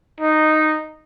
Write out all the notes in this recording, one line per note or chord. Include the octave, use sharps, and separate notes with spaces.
D#4